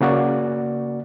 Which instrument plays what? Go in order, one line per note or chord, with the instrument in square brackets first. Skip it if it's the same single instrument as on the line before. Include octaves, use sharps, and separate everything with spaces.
[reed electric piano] C#3 A#3 F#4 D5